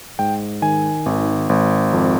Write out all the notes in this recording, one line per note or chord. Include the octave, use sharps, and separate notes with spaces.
G#2 G5
D#3 G#5
G#1
G#1
F2